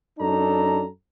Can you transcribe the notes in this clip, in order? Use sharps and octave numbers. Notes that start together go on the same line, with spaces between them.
F#2 D4 D#4 A4 A#5